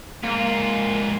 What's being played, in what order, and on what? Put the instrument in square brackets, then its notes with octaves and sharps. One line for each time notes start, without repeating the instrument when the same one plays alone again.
[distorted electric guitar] G#2 F4 [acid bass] A#3